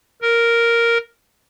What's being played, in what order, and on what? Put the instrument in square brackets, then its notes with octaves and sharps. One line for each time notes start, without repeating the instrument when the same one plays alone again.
[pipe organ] A#4